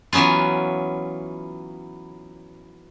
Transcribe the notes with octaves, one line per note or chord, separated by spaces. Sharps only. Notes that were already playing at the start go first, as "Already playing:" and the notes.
E3 F#3 B3 C#4 F4